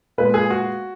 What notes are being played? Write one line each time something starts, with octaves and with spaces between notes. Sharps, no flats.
A#2 G#3 B3 B4
G#4
F#4